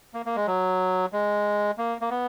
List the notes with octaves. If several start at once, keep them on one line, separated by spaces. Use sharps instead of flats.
A#3
A#3
G#3
F#3
G#3
A#3
A#3
B3